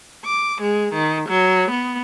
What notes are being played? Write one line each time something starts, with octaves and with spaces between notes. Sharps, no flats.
D6
G#3
D#3
F#3
B3